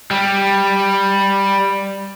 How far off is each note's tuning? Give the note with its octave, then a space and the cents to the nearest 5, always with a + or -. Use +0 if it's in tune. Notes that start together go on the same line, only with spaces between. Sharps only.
G3 +5